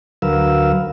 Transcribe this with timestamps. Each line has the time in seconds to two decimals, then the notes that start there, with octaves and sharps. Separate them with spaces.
0.22 D2 F#3 A#4 B4 F5 E6